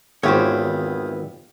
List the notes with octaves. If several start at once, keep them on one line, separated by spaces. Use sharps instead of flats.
G#1 E2 B3 F4 G4 C5 C#5